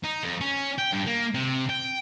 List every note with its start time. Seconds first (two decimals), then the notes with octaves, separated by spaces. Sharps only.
0.04 D#4
0.23 F2
0.41 C#4
0.79 G5
0.93 G2
1.07 A#3
1.34 C3
1.69 G5